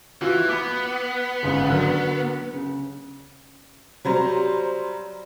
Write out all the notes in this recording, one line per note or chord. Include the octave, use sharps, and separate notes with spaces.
E3 F4 F#4
B3 B5 D6
G1 G#2 C#3
D3 F#3 A#4
C#3
F#3 G3 C5 A#5